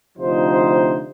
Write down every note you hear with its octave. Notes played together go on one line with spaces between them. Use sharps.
D2 C3 F3 D#4 C5